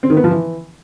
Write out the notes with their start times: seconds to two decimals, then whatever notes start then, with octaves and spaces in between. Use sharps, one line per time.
0.03 C4
0.10 D#3
0.17 B3
0.24 F3
0.31 E3